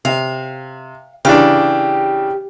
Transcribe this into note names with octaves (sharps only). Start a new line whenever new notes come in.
C3 F5
C#3 E3 D4 G4